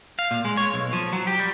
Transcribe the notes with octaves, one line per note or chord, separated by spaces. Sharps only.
F5
A#2
G#3
C#5
B1
F3
F#3
G4
G3